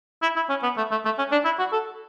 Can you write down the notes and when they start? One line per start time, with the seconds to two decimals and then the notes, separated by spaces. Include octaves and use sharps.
0.22 E4
0.36 E4
0.50 C#4
0.63 B3
0.77 A3
0.92 A3
1.05 A3
1.19 C#4
1.32 D4
1.45 E4
1.59 F#4
1.73 A4